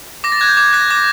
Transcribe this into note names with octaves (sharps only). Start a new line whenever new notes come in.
D6 A#6
A6
F#6 G#6
G6
D6 G#6
F#6 A#6
D6 A#6